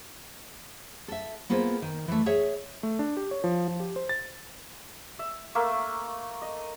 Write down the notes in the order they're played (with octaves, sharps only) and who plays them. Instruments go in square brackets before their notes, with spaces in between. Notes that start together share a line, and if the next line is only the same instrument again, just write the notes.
[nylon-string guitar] A4 E5
A#3 B3 F4 G#4 C5
D#3
E3 A3
G#4 C#5 E5
[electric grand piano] A3
D4
G4
C#5
F3
F3
G4
C5
A6
[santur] E5
A3 A#3 A#4 E5
D#5